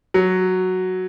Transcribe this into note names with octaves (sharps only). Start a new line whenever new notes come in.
F#3